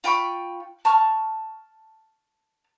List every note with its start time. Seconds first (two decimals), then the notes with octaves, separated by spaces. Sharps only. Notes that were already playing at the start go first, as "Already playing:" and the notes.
0.04 F4 G5 B5 C#6
0.85 A5 C#6 F6